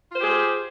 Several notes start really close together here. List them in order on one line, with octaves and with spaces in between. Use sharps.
F4 C5 G4 G#4